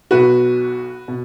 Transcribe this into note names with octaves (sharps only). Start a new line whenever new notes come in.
B1 B2 B3 F#4 B4
B2